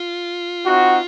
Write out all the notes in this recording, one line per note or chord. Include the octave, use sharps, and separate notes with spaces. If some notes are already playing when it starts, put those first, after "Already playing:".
Already playing: F4
C4 D#4 F#4